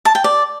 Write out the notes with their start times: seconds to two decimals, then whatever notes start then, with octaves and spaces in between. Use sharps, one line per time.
0.05 A5
0.15 G5
0.24 D5